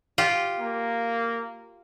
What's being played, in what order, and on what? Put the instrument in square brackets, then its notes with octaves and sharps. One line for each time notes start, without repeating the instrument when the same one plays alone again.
[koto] F4 G4
[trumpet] A#3